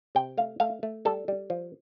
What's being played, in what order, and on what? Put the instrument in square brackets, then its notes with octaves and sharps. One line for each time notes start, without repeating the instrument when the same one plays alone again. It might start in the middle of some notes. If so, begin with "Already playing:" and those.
[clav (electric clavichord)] C3 G5
A3 F5
A3 F5
A3
G3 A4
G3
F3